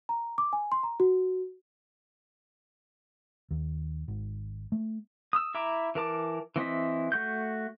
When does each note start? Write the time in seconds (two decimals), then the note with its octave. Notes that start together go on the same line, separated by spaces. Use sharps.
0.09 A#5
0.38 D6
0.53 G#5
0.72 C6
0.83 A#5
1.00 F#4
3.51 D#2
4.08 G#1
4.72 A3
5.33 D#6 E6
5.54 E4 E5 A#5 D6
5.95 E3 A#4 A5 D6
6.56 E3 C4 D#5 E5
7.12 A3 F#4 G6